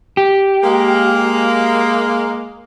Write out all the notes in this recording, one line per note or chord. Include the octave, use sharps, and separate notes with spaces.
G4
G#3 A#3